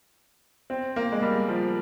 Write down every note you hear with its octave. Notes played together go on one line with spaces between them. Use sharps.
C4
A#3
G#3
G3
F3